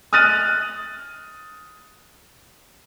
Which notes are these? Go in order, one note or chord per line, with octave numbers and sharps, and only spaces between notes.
D#6 F6 F#6 A6 D#7